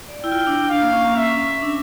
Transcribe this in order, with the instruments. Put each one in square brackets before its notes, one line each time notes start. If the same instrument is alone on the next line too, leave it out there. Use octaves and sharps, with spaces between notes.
[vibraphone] D5
[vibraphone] E4 [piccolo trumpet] G5
[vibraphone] F4
E4
D4
[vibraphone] D4 [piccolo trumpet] F5
[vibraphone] A#3
C#4
A#3
[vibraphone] C#4 [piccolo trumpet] E5
[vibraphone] C#4
C#4
D4